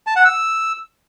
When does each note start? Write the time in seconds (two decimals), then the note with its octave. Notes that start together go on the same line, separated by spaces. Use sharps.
0.07 A5
0.16 F#5
0.25 E6